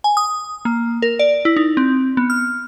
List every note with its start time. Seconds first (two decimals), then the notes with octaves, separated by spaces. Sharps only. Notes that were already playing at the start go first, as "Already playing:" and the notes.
0.04 G#5
0.17 D#6
0.65 A#3
1.02 A#4
1.19 D5
1.45 E4
1.56 D#4
1.77 C4
2.17 B3
2.30 F6